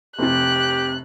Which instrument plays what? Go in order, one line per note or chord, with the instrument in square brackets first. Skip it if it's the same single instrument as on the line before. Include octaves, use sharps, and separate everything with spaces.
[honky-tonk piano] F1 C3 [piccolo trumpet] G4 [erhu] F#6